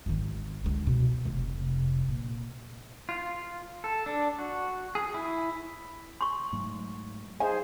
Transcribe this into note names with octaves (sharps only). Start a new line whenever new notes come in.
G#1 D#3
C#2 D3
B2
F1 C3
A#2
F4
A4
D4
F#4
G#4
E4
C6 C#6
G#2 F#3 A3
D#4 G#4 C5 F5 G#5